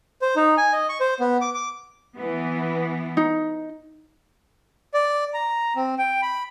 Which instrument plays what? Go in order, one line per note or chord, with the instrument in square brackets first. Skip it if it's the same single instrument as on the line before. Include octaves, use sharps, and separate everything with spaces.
[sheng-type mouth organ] C5
D#4
G#5
D#5
C#6
C5
B3
D6
D6
[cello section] E3 B3
[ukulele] D#4
[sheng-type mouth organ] D5
A#5
C4
G5
B5